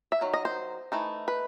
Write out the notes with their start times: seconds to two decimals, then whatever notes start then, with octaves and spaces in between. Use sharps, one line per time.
0.12 E5
0.21 D#3 F#3
0.33 D#5
0.45 C5
0.92 E3 A3 D#4
1.28 B4